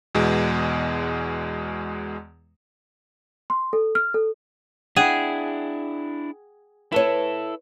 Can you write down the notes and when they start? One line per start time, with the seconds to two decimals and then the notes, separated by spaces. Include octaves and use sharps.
0.15 E2 B2 G#3
3.50 C6
3.73 A4
3.95 F6
4.14 A4
4.96 D4 E4 G#4 F#5 G5 F#6
6.92 E4 A4 B4 C#5